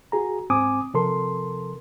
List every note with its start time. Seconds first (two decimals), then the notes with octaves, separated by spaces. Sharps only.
0.12 F#4 G#4 A#5
0.50 G#2 C4 G#5 D6 D#6
0.94 C3 F3 A4 A#4 C6